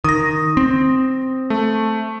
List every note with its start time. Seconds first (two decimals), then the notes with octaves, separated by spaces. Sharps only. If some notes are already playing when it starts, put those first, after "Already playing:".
0.04 D#3 D#6 A#6
0.57 C4
1.50 A3